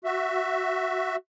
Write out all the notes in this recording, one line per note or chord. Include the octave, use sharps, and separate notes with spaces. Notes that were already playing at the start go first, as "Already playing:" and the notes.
F#4 E5